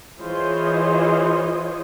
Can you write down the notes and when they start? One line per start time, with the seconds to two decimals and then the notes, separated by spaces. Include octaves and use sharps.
0.19 E3 F4 G#4 C5 C#5 D#5